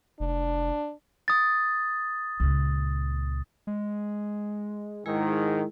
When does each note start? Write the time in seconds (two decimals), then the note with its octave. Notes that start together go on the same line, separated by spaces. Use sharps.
0.20 F1 D4
1.28 D#6 A6
2.40 C#2 A#2
3.67 G#3
5.06 G#2 D#3 G#3 E4 G#4